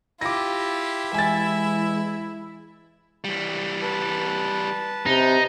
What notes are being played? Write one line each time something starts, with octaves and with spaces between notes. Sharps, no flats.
E4 F4 G4 D6 A#6
E3 G#3 E5 G#5 A6
E3 G3
B4 A5
C3 D#4